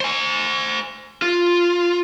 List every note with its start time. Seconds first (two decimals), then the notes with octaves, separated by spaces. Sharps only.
0.01 C5 G#5
1.22 F4